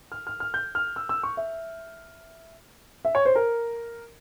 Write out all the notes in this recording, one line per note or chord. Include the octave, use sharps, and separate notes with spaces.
F6
F6
F6
G6
F6
E6
E6
C#6
E5
E5
C#5
C5
A#4